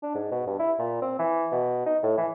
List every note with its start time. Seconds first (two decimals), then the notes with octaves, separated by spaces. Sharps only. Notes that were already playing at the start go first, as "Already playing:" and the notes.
0.03 D4
0.15 G#2
0.32 B2
0.47 G2
0.59 E4
0.79 A#2
1.02 C4
1.19 E3
1.52 B2
1.86 D#4
2.03 A2
2.18 E3